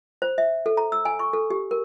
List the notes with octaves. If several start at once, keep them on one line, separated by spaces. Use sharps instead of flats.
C5
E5
A4
A#5
E6
G#5
C#6
A4
G4
A#4